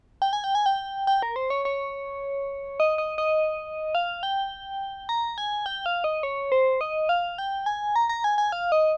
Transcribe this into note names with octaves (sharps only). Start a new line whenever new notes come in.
G5
G#5
G5
G#5
G5
G5
A#4
C5
C#5
C#5
D#5
D#5
D#5
F5
G5
A#5
G#5
G5
F5
D#5
C#5
C5
D#5
F5
G5
G#5
A#5
A#5
G#5
G#5
F5
D#5